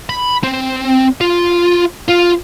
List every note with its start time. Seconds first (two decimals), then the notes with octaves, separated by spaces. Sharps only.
0.09 B5
0.43 C4
1.21 F4
2.08 F4